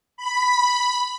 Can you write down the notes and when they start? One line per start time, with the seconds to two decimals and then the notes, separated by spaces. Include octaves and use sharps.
0.17 B5